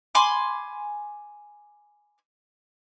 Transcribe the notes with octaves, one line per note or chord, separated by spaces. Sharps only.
G#5 B5 C6 D6